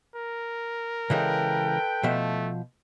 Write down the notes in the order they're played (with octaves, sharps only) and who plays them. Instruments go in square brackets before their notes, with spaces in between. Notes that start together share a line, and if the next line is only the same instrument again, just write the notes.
[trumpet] A#4
[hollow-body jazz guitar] C#3 E3 G#3 [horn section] A4 B4 G5
[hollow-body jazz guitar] B2 F3 E5 [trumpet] A3